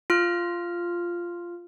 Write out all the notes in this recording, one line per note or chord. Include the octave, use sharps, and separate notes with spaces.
F4 F6